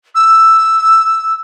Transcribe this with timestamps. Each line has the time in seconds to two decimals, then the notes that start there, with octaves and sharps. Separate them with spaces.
0.15 E6